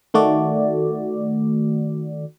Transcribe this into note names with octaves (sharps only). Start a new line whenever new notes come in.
D#3 A3 F#4 D5